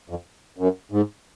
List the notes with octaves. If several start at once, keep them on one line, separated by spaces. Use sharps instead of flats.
F2
F#2
G#2